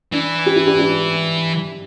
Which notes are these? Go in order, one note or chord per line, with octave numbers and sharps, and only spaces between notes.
E3 D4
G4
E4
D4 G4
D4 G4